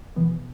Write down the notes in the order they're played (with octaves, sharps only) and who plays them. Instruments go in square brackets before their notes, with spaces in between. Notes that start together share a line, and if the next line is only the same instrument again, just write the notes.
[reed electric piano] B2 B3 [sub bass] E3